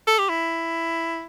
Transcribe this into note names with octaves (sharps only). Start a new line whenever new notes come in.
A4
G4
E4